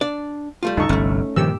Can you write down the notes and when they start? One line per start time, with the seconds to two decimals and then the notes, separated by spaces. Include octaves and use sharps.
0.01 D4 D5
0.63 G3 A3 F4
0.77 D2 G2 C#3 D#4 A4 C#6
0.89 G1 C2 A3 C#4
1.36 G2 A#2 D#3 F3 G3 G4 E6